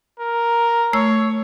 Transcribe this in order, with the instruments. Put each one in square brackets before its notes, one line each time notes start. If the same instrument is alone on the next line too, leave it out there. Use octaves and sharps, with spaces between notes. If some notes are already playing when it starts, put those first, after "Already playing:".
[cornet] A#4
[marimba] A3 E6 [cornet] C#5